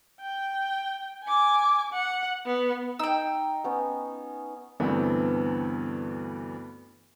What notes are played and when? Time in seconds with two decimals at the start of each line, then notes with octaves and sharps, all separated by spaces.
0.21 G5
1.24 G#5 D6
1.92 F#5
2.46 B3
2.99 D#4 G5 E6
3.64 B3 C#4
4.80 D2 G2 E3 B3 C4